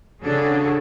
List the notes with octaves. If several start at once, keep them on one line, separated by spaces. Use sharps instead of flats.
C#3 C#4 D4 F#4 G#4 A4